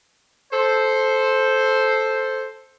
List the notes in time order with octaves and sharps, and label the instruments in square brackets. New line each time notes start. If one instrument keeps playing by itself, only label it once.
[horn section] A4 C5